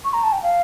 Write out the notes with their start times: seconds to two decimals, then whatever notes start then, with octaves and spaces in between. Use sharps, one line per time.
0.05 C#6
0.13 A#5
0.23 A5
0.32 G5
0.43 F5